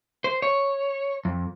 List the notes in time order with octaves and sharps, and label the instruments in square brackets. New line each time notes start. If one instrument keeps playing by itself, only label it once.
[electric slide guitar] C5
C#5
F2